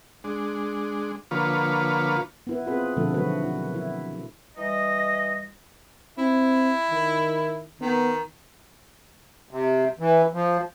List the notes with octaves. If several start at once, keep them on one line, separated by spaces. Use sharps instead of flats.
G#3 D4
D3 F3 A#3 F4 B4 C#5
B3 E4 B4
C4 F4 G#4 B4
B2 D3 F3 A3 A4
D3 D#3 F#3 A3 F#4 B4
E4
E4
E3 G3 D#5
C4 E4
D#3
D#3 B3
C3
E3
F3